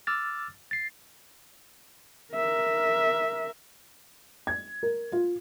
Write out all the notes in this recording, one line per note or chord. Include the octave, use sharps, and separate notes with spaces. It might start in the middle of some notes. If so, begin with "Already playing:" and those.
D6 E6 F6 A6
A6 C7
A#4 E5
G#6
A#4
F4